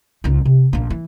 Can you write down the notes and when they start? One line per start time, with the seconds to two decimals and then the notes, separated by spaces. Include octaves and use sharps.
0.24 C#2 D#4
0.45 C3
0.73 A#1 A#3
0.90 E3